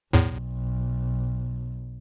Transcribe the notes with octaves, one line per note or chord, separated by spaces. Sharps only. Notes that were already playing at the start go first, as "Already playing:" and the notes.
B1 E2 A2